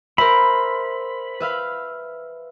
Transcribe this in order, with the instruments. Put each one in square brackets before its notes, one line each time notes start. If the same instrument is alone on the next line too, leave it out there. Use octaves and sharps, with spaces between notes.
[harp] A#4 C5 E5 [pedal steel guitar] B5
[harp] B4 E5 F5